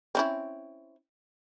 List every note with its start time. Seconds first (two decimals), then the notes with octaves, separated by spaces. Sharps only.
0.15 C4 C#4 E4